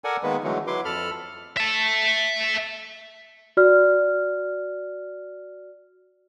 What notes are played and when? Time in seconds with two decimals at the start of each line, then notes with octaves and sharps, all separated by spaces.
0.04 A4 A#4 D5 F#5 G#5
0.23 D#3 G#3 A#3 B3 B4
0.43 D3 E3 F#3 G#3 A3
0.67 F#3 E4 B4 C6 D6
0.85 F2 A4 B5 F6
1.57 E5 A5
3.57 F#4 D5 F6